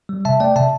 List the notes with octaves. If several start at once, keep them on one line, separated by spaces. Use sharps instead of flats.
G3
C3 E5 A5
A3 D5 G5
C3 E5 A5